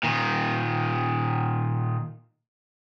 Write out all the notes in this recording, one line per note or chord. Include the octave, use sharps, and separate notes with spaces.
A#2 D#3